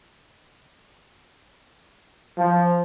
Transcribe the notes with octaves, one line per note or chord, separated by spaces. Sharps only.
F3